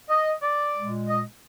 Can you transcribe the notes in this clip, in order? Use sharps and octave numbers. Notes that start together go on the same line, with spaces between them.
D#5
D5
A#2 G#3
D#5